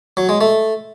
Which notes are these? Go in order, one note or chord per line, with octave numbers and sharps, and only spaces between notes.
F#3
G#3
A3